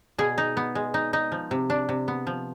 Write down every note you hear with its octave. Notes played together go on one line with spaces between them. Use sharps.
B2 G#4
D#4
B3
G#3
D#4
D#4
F3
C3
D4
C3
B3
F3